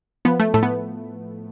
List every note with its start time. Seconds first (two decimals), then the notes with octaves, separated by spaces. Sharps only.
0.25 F3 B3
0.40 A3
0.54 A2 A3
0.63 B3